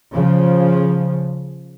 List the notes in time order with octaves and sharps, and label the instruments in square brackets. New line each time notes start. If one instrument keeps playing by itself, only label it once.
[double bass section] C#3 F3